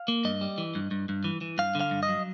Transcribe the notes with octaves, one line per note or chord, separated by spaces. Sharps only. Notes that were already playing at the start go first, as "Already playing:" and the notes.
Already playing: F5
A#3
G2 D#5
G3
E3
G2
G2
G2
E3
E3
G2 F5
D3
F5
G2
D#5
F#3